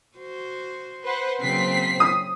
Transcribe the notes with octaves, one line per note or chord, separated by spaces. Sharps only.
F#4 C5
B4 C5 F#5
C#3 F#3 A#3 C4 B6 C7
D#6